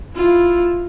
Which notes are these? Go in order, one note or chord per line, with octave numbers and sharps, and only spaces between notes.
E4 F4